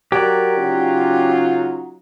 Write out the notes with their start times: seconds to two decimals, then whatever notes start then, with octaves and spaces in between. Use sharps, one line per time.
0.12 F#3 G4 A#4 D5
0.58 C#3 C#4 D#4 F4